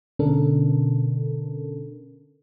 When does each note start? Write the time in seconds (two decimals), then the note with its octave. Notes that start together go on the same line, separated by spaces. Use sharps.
0.19 B2 D3 C#4 D4 A4 A#4